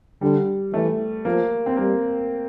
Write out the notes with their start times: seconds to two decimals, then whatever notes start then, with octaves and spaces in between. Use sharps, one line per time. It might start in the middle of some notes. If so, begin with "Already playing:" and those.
0.21 D3 G3
0.73 E3 A3
1.25 F3 A#3
1.66 C4
1.77 G3 A#3